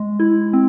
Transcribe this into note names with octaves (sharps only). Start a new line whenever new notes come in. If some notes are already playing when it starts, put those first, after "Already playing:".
Already playing: G#3
E4
C4